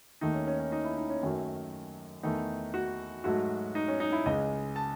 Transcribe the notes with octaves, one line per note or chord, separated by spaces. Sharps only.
D#2 D#3 A3 D#4
C#4
C#4
C#4
D#4
E4
D#4
C#4
F#2 D#3 F#3 A3
E2 D#3 A3 D#4
F#4
G#2 F#3 A3 F#4
D#4
C#4
D#4
E4
C#2 C#3 G#3 D#5
A5